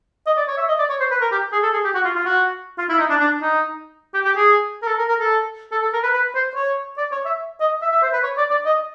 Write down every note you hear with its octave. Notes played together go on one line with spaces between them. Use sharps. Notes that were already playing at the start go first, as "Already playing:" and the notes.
D#5
D5
C#5
E5
D#5
D5
C#5
C5
B4
A#4
G4
G#4
A4
G#4
G4
F#4
F4
F4
F#4
F4
E4
D#4
D4
D4
D#4
G4
G4
G#4
A#4
A4
A#4
A#4
A4
A4
A4
A#4
B4
B4
C5
C#5
D5
C#5
E5
D#5
E5
E5
C5
B4
C#5
D5
D5
D#5